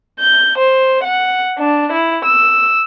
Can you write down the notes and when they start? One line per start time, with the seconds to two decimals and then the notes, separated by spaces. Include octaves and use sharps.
0.18 G6
0.59 C5
1.04 F#5
1.58 D4
1.92 E4
2.24 E6